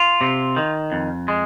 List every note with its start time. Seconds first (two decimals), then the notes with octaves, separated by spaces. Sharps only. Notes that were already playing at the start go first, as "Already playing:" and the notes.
Already playing: F4
0.21 C3
0.56 D#3
0.92 F2
1.28 G#3